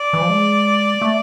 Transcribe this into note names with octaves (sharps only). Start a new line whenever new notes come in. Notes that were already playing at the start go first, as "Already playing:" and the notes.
Already playing: D5
E3
F3
G#3
A3